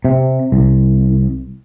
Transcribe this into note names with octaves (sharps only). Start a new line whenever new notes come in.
C3
C2